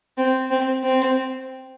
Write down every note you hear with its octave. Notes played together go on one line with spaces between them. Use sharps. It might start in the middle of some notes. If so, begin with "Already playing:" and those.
C4
C4
C4